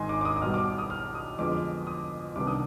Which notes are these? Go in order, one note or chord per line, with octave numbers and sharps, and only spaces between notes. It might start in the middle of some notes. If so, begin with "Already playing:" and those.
Already playing: G#1 G#2 D#3 D#5 G#5 C6
D6
D6
D#6
D#6
B1 B2 G3 F6
D6
D6
D#6
F6
D#6
F2 D3 G#3 B3 D6
D#6
C2 C3 D#3 B3 D4 D6
D#6